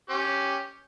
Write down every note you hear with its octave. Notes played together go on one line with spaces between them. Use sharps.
C#4 G4